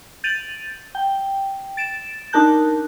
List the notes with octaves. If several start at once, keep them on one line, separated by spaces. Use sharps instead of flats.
G6 A6 D7 D#7 F7 F#7
G5
A6 D7 E7
D4 D#4 A#4 A5 F#6 G6